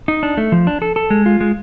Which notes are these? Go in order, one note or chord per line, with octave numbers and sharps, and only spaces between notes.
D#4
D4
A3
F3
D4
A4
A4
G#3
F4
G#3